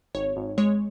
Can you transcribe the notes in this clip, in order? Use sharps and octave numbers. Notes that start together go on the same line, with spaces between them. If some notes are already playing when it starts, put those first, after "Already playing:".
G#1 C#5
G#1
G#3 C#5